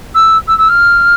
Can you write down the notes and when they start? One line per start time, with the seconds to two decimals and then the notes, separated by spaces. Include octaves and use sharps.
0.14 E6
0.47 E6
0.57 E6
0.68 F6